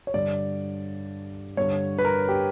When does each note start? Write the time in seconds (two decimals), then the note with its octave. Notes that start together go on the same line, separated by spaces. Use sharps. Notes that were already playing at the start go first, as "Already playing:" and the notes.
0.07 C#5
0.14 G2 D3 D5
1.57 G2 D3 C#5
1.98 B4
2.05 A#4
2.29 G4